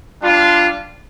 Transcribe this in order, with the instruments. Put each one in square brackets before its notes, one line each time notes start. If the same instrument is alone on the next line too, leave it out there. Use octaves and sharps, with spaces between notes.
[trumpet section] G3 D4 F4